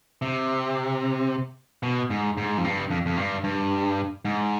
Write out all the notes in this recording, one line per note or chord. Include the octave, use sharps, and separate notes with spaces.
C3
B2
G#2
G#2
F2
G2
F2
F2
G2
G2
G#2